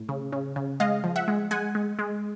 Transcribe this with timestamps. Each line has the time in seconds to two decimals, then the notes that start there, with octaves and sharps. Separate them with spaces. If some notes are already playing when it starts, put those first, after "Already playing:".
Already playing: A2
0.09 C#3
0.32 C#3
0.56 C#3
0.80 G#3 D#5 F5
1.04 F3
1.16 E5 F#5
1.28 G#3
1.51 G#3 F#5 G#5
1.75 G#3
1.99 G#3